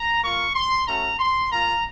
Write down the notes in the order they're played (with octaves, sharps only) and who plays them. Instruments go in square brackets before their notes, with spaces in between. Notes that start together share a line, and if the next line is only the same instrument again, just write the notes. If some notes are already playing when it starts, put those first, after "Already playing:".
Already playing: [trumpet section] A#5
A#3 F4 C#6
C6
A3 C#4 F#4 A#5
C6
A#3 F4 A#5